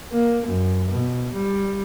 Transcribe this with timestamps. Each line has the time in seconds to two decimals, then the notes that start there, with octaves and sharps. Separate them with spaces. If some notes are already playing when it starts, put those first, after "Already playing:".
0.12 A#3
0.47 F#2
0.90 B2
1.33 G3